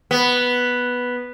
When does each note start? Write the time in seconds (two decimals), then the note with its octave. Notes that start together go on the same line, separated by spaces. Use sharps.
0.11 B3